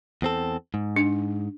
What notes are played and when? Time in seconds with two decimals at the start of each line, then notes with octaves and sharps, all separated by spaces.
0.22 E2 C4 A4
0.74 G#2
0.96 D4